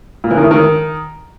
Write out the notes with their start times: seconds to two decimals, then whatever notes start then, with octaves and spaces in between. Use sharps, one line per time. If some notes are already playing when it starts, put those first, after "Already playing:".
0.24 A#2
0.31 E3
0.37 D#3
0.44 A3
0.51 D#3